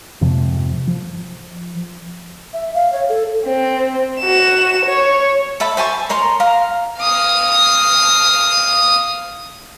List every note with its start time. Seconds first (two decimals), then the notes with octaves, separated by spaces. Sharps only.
0.21 F2 G#2 C3 F3
0.87 F3
2.53 E5
2.74 F5
2.93 C#5
3.09 A4
3.47 C4
4.20 F#4 E7
4.85 C#5
5.60 A4 E5 A5 B5
5.77 C5 G#5 A5 C#6
6.09 A#4 C#5 A#5 C6
6.40 F5 A#5
7.00 F5 D#6